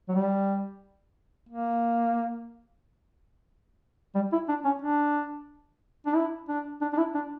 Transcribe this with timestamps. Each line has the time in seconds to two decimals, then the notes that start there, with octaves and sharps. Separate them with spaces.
0.09 F#3
0.15 G3
1.49 A#3
4.15 G3
4.32 E4
4.49 D4
4.65 C#4
4.82 D4
6.06 D4
6.15 E4
6.48 D4
6.81 D4
6.93 D4
6.98 E4
7.15 D4